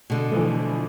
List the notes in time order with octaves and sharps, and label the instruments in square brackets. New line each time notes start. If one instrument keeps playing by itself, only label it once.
[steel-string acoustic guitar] B2 D3
[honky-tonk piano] E3 F3 A3